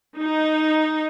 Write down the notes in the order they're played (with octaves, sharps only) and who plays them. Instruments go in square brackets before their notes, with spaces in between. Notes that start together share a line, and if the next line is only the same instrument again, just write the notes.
[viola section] D#4